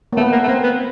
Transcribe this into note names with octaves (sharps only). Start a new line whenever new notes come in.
A#3
A3 B3
A#3
A3
A#3 C4
B3